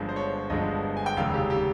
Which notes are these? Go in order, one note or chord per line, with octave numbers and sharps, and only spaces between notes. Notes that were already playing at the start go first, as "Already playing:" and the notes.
Already playing: G1 G2 F3 G#3
C5
C#5
G1 G2 F3 G#3 D#5
G#5
G5
F1 D#2 C#3 G#3 F5
G4
G4